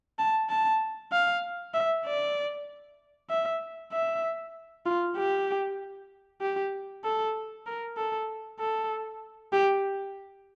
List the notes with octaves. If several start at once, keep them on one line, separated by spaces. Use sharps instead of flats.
A5
A5
F5
E5
D5
E5
E5
F4
G4
G4
A4
A#4
A4
A4
G4